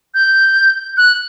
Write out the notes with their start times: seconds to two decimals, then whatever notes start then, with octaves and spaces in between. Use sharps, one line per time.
0.14 G6
0.97 F#6